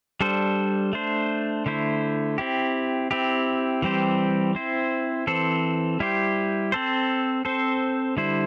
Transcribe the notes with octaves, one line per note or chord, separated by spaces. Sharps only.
G3 D4 A4 C5
A3 D4 C5
D3 A3 E4 C5
C4 E4 G4
C4 E4 G4
E3 G3 C4 G4 C5
C4 E4 C5
E3 C4 A4 C5
G3 E4 G4 C5
C4 A4 C5
C4 A4 C5
D3 G3 E4 C5